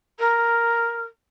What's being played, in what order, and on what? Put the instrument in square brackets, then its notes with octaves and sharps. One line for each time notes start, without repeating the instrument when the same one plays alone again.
[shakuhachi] A#4